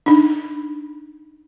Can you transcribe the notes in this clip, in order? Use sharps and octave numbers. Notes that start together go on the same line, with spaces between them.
D4 D#4